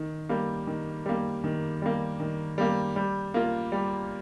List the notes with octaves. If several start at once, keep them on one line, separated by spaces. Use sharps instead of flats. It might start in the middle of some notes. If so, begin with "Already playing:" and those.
Already playing: D#3
G3 A#3
D#3
G3 A#3
D#3
G3 A#3
D#3
G3 A#3
G3
A#3 F4
G3